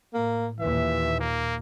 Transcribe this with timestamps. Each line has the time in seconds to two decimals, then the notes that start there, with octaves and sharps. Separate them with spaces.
0.14 A2 A#3
0.60 D#2 A#2 E3 E5
1.20 A#3